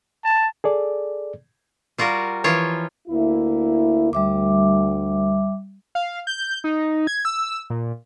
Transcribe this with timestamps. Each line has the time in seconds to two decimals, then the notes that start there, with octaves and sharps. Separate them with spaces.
0.24 A5
0.64 G#4 A4 D5
1.98 G3 F4 F#4 A#4
2.44 E3 F3 F4 C#5
3.08 D2 A#3 E4
4.13 D2 G3 E5 D6
5.95 F5
6.27 G6
6.64 D#4
7.07 G#6
7.25 E6
7.70 A#2